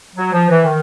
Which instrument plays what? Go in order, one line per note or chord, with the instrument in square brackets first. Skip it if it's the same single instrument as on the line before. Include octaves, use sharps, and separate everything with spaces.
[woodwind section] F#3
F3
E3
D#3